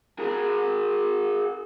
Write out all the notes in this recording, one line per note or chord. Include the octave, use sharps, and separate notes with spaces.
G#4 A#4